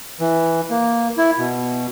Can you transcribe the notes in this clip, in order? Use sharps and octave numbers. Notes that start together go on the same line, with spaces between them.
E3
A#3
E4
B2